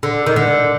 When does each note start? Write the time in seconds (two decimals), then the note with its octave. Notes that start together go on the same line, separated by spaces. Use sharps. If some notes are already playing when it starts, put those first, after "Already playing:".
0.03 D3
0.26 D#3
0.36 D3